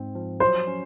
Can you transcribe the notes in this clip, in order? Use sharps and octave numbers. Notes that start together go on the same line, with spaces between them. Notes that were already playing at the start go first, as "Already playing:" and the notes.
Already playing: G#2 C4
F3
F#3 C5
C#4